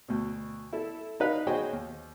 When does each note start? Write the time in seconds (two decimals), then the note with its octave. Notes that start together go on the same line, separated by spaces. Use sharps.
0.09 D2 B2
0.73 E4 A4
1.20 D#4 B4 F5
1.47 F#4 G#4 C5 C#5 D#5 G5
1.73 D#2